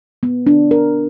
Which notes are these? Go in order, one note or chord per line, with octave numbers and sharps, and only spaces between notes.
B3
D4
A#4